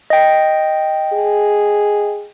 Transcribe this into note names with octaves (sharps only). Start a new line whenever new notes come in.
D#5 G5
G#4